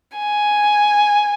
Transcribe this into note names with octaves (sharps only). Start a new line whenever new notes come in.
G#5